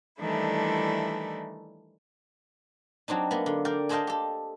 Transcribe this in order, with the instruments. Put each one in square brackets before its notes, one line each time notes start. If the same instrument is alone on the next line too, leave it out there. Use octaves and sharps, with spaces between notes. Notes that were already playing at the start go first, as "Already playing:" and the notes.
[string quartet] D#3 E3 G3 A3 D4 E4
[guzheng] F#3 C4 D4 D#4
A#3 B3
D3
A#4 D5 F5 G5
G#4 A4 C5 D#5 F5 G5
G4 A4